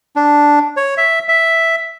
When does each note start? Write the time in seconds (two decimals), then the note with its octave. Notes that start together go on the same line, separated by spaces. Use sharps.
0.16 D4
0.77 C#5
0.97 E5
1.29 E5